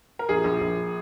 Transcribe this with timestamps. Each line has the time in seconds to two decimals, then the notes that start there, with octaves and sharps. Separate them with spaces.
0.19 A#4
0.29 A#1 G#4
0.44 A#1
0.61 A#1